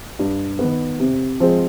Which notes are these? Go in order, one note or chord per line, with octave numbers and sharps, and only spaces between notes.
G2
D#3 B3
C3
F3 G#3 C4